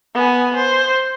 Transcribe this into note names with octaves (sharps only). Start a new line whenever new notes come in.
B3 G#5
C5